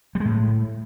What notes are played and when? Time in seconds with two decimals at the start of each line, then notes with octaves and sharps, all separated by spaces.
0.15 G3
0.20 G#3
0.25 A2